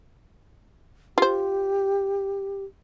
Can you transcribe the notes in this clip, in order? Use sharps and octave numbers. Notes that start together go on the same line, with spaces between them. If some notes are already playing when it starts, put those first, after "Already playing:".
F4 G4 C5